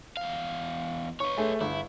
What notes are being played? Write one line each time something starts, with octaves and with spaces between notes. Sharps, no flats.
E2 F5
B4 C#5 C#6
A3 G#4
G1 E4